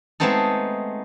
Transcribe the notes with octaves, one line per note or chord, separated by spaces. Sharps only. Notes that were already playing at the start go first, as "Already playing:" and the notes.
G#3 A3 B3 C4 D#4 A4